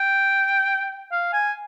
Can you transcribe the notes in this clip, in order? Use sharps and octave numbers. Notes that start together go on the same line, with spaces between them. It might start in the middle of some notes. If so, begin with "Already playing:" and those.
Already playing: G5
F5
G#5